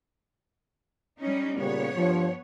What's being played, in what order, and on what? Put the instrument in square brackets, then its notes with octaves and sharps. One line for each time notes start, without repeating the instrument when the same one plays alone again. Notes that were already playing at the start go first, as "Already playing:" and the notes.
[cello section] G3 C#4 D#4
[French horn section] A#2 C#3 G3 [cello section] B3 C#5
[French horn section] G2 F3